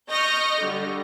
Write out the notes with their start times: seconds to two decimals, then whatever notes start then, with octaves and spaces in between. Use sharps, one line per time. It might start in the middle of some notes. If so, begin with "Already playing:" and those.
0.11 D#5 C#6 F6 G6 A#6
0.60 D3 G3